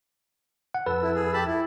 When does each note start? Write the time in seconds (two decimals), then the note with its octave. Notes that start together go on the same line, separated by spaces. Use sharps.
0.74 F#5
0.86 F2 A4 B4 E6
1.02 E4
1.15 G#4
1.34 G4 A5 B5
1.46 E4